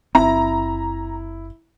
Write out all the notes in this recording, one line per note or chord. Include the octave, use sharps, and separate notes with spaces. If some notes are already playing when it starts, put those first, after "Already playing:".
F#1 C4 E4 A#5